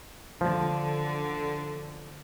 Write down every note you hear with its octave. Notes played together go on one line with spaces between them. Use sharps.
D3 F3